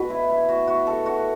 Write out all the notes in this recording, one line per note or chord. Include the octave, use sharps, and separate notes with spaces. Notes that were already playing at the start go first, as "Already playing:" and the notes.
Already playing: B2 B3 F#4 B4
E4
E4
F#4
F#4
A4
F#4